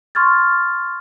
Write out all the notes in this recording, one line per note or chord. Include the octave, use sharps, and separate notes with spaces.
C6 C#6 F6 G#6 A6